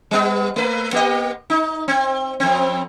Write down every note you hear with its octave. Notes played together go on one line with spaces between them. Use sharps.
G3 B3
A3 B4
A#3 G4 D#5
D#4
C4
F2 C4